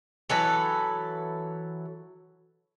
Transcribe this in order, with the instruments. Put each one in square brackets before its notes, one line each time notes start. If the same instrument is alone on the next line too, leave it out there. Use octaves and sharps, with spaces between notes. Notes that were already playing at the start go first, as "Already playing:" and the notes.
[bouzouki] E3 F#3 A4 B4